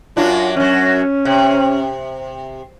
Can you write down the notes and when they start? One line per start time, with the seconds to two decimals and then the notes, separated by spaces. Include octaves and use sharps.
0.17 F#2 F#3 D4 F4
0.56 F#2 F#3 C#4
1.25 C3